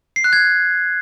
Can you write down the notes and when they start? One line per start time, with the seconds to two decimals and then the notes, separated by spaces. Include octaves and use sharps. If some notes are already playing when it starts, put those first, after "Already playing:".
0.16 C7
0.24 F#6
0.33 G#6